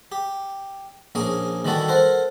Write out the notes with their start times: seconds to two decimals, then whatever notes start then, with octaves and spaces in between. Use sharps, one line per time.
0.12 G4
1.15 A#1 A#3 C#4 G#4 G#5
1.65 D#3 E3 G3 E4 F#4 A4
1.88 A4 A#4 C5 F#5